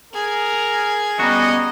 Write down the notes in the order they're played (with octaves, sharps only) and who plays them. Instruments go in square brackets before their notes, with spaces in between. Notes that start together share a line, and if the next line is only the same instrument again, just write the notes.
[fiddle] G#4 [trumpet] A#4
[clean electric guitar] G3 F#4 [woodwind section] B3 C#4 A#5 [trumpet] D#5